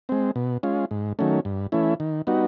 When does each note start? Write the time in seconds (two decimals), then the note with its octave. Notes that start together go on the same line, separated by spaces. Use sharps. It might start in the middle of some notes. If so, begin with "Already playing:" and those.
0.09 G#3 C4
0.36 B2
0.63 G#3 C#4 F4
0.91 G#2
1.19 D#3 F#3 A3 C#4
1.45 G2
1.72 E3 A3 C#4 E4
2.00 D#3
2.27 G3 B3 D#4 F#4